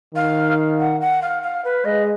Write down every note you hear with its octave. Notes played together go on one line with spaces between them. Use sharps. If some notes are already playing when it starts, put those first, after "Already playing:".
D#3 F5
F#5
F#5
F5
F5
B4
G#3 D#5